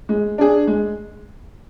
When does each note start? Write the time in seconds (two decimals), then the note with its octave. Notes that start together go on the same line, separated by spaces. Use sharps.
0.09 G#3
0.38 D4 G#4
0.67 G#3